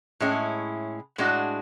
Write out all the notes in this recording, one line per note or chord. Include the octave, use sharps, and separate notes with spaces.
A2 G#3 C#4 E4
A2 G#3 D4 F#4